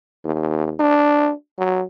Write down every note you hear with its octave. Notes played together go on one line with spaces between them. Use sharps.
D#2
D4
F#3